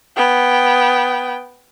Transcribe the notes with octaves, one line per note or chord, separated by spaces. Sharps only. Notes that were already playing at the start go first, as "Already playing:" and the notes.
B3 G5